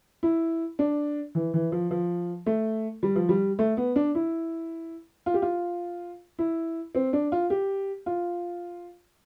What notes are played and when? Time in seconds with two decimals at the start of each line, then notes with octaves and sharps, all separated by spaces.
0.23 E4
0.79 D4
1.35 E3
1.54 E3
1.72 F3
1.91 F3
2.46 A3
3.03 G3
3.16 F3
3.29 G3
3.59 A3
3.77 B3
3.96 D4
4.15 E4
5.26 F4
5.34 G4
5.42 F4
6.39 E4
6.95 C4
7.13 D4
7.32 F4
7.50 G4
8.06 F4